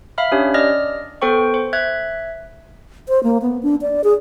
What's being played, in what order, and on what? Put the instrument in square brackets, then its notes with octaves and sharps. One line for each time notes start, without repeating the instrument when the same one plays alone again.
[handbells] E5 F5 B5 F6
C#4 D4 G4 C#5
D5 D#5 F6 A#6
B3 A4 C5 G5 C#6
C5
E5 F#6 G#6
[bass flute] C5
A#3
B3
D4
D5
G#4